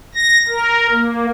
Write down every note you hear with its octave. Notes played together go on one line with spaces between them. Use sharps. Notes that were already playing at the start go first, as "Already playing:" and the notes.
A#6
A#4
A#3